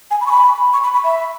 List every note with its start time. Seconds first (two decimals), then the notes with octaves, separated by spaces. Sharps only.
0.11 G#5
0.21 B5
0.27 C#6
0.31 B5
0.73 C#6
0.83 B5
0.94 B5
1.04 E5